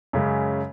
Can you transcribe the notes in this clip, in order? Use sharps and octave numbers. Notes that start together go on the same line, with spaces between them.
F#2 C#3 G#3